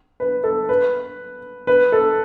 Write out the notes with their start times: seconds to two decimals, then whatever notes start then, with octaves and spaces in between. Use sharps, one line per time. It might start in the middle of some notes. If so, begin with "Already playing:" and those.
0.20 B4
0.44 A4
0.69 B4
1.67 B4
1.92 A4